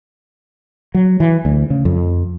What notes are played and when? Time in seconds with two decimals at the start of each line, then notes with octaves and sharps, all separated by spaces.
0.94 F#3
1.20 E3
1.45 D2
1.70 C#3
1.85 F2